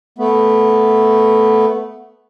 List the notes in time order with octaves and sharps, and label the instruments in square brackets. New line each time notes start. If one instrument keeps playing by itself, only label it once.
[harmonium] A3 B3